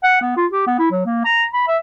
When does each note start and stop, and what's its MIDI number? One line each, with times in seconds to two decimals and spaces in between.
0.04 0.19 78
0.22 0.36 59
0.37 0.46 65
0.51 0.65 67
0.67 0.76 59
0.79 0.91 64
0.91 1.01 54
1.06 1.22 58
1.25 1.45 82
1.54 1.64 83
1.68 1.78 76